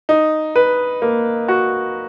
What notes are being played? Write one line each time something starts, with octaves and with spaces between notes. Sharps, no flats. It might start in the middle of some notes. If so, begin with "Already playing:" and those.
D#4
B4
A#3
F#4